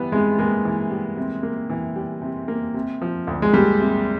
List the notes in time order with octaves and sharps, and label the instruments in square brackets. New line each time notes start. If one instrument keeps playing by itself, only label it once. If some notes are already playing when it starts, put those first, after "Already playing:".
Already playing: [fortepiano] E3 G3 [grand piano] B3
[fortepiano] C3 [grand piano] G#3
[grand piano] G#3 [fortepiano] A#3
[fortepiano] E3
G3
C3
A#3
E3
G3
C3
A#3
C3
F3
D2
[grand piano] G#3
[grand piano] G3 [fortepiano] A#3
[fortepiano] C3